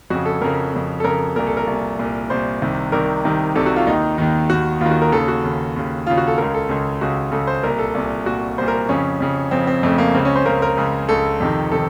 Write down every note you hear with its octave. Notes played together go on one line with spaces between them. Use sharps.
F2 C#3 F#4
A4
F2 C#3 A#4
F2 C#3
A4
F2 C#3 A#4
C2 A#2 A#4
A4
A#4
C2
A#2
C2 A#2
C2 A#2 C5
C2 C3 D#3
C2 C3 D#3 A#4
C2 C3 D#3
C2 C3 D#3 A4
F#4
F4
D#2 D#3 D#4
D#2 D#3
D#2 D#3 F#4
D#2 D#3 F4
F#4
A#4
D#2 C#3 A4
F#4
D#2 C#3
D#2 C#3
D#2 C#3 F4
F#4
A4
C#2 C#3 A#4
A4
C#2 C#3
C#2 C#3 F#4
C#2 C#3 A4
C5
C2 A#2 A#4
A4
C2 A#2
C2 A#2 F#4
C2 A#2 C5
A#4
F2 C#3 C#4
F2 C#3
F2 C#3 C4
C4
F2 C#3 A3
A#3
C#2 C#3 C4
C#4
C5
C#2 C#3 A#4
A#4
C#2 C#3
C#2 C#3 A4
F2 C3 D#3
C3 D#3 A4